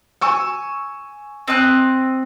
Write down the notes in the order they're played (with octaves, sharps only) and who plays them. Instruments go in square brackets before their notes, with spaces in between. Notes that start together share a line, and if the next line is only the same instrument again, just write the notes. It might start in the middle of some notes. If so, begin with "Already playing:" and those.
[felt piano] G#5 C#6 E6
[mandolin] C4 D#5 F#6